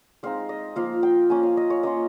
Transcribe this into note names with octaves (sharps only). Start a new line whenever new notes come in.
G#3 C4 D#4 F5
D#5
F3 A#3 F4 F5
G5
A#3 C#4 F4 G#5
F5
D#5
C#5
A#3 C#4 F4 D#5